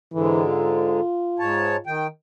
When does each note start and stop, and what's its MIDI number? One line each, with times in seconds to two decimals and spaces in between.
0.14 1.00 44
0.14 1.00 50
0.14 0.42 52
0.48 1.93 65
1.39 1.77 44
1.39 1.77 73
1.39 1.77 81
1.87 2.07 51
1.87 2.07 79